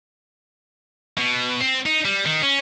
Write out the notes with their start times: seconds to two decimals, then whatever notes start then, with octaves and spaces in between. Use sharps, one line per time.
1.18 B2
1.60 C4
1.86 D#4
2.05 G3
2.26 D#3
2.43 C#4